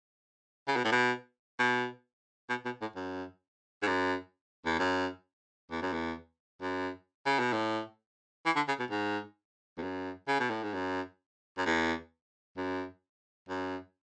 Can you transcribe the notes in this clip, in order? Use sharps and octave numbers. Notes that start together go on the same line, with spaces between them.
C#3
B2
A2
B2
B2
B2
B2
A2
F#2
G#2
F#2
E2
F#2
E2
F#2
E2
F#2
C#3
B2
A2
E3
D3
C#3
B2
G#2
E2
F#2
C#3
B2
A2
G#2
F#2
F#2
E2
F#2
F#2